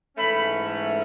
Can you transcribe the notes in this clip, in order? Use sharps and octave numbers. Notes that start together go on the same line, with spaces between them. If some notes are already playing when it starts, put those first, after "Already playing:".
G#2 E3 A3 C#4 B5